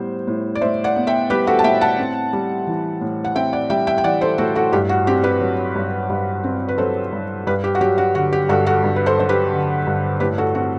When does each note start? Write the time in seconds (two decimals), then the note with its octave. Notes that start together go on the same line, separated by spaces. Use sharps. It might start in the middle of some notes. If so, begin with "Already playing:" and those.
Already playing: A2 G3 B3 C5
0.27 A2
0.55 D5
0.61 A2 C5 E5
0.84 D5 F#5
0.96 B3
1.07 E5 G5
1.30 G3 G4 B4
1.47 F#4 A4
1.59 A5
1.64 A2 E5 G5
1.81 F#5 A5
1.99 C4
2.33 G3
2.67 E3
3.01 A2
3.25 F#5
3.35 C4 E5 G5
3.53 D5 F#5
3.70 G3 E5 G5
3.87 E5 G5
3.98 G5
4.04 E3 D5 F#5
4.21 A4 C5
4.38 A2 F#4 A4
4.55 F#4 A4
4.73 G2 G4
4.89 F#4
5.07 C4 G4
5.24 G4 B4
5.41 F#3
5.75 G2
6.09 G2
6.44 C4
6.68 B4
6.78 F#3 A4 C5
7.12 G2
7.47 G2 G4 B4
7.64 G4
7.75 F#4
7.81 F#3 G4
7.98 F#4
8.15 D3 F#4
8.33 G4
8.49 G2 F#4 A4
8.66 F#4 A4
8.84 G2
8.96 B4
9.06 A4 C5
9.18 F#3 C5
9.29 G4 B4
9.52 D3
9.87 G2
10.20 A2 G4 B4
10.38 F#4 A4
10.55 C4 F#4